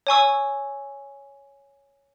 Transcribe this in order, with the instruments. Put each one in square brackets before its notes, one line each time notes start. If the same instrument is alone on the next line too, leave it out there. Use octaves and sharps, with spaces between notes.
[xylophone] C#5 G#5 C#6 E6